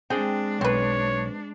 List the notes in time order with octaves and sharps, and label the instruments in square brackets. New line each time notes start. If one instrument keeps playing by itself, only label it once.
[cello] G#3 D4 [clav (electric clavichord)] C4 G#4 [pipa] G5
[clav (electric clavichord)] B1 [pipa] C4 B4 [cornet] C#5